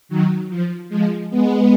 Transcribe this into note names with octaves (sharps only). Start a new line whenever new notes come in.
D#3 F#3
F3
F3 G#3
G#3 B3